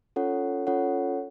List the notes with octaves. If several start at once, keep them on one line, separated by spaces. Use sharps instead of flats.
C#4 F4 A4 C#5 F#5
C#4 F4 A4 C#5 F#5